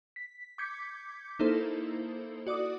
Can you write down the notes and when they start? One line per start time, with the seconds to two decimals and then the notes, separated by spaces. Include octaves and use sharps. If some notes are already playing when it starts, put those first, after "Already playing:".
0.16 B6
0.58 D6 G6 G#6 B6 C#7
1.39 A#3 D#4 E4 A4 C5
2.47 F#4 D5 D6 D#6